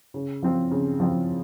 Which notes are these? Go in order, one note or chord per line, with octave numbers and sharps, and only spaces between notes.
C#3
F3 C4 F4
C#3
F3 C4 F4